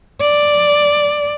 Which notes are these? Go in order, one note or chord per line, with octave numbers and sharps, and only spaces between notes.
D5